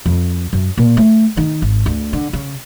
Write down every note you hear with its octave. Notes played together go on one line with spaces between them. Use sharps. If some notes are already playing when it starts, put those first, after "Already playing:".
F2
F#2
A#2
A3
D#3
G#1
D2
D3
C#3